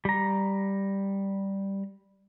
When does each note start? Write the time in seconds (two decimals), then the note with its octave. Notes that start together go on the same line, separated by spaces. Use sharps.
0.05 G3 A#5